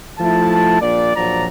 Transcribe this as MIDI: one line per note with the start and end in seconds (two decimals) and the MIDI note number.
0.19 0.81 53
0.19 0.81 57
0.19 0.81 64
0.19 0.81 81
0.81 1.13 34
0.81 1.13 46
0.81 1.13 74
1.16 1.46 34
1.16 1.46 53
1.16 1.46 54
1.16 1.46 74
1.16 1.46 82